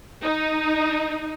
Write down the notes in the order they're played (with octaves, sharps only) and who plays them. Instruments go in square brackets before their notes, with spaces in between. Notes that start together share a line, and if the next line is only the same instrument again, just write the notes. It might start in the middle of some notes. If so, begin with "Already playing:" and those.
[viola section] D#4